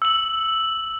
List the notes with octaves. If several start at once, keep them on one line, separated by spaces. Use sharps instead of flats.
E6 F#7